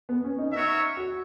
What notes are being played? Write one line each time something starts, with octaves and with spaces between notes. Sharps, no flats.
B3
C#4
D#4
D#4 F#4 A#4 C#5 E5
F#4